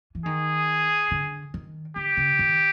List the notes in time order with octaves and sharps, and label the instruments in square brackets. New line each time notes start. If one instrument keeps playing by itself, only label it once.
[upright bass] E3
[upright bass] D#3 [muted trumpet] G#4
[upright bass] D3
D#3
[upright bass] D3 [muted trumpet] G4
[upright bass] C#3
D#3